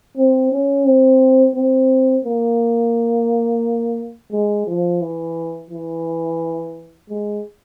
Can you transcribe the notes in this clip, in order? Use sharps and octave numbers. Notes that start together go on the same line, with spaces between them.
C4
C#4
C4
C4
A#3
G#3
F3
E3
E3
G#3